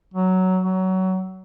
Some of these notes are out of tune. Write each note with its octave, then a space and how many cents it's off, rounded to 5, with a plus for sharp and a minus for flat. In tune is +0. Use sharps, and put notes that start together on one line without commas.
F#3 +10
F#3 +20